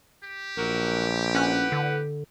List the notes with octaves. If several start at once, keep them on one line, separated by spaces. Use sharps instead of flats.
G4
A#1 F#3 F#4 A#4
A2 C#4 B4 F#5
D3